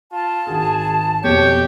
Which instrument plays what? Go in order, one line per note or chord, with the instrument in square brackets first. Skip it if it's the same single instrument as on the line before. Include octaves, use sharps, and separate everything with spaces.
[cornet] F4 [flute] A5
[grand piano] G#1 F#4 [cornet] G#4
[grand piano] F2 B2 C4 [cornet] G4 [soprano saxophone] C#5 [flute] G6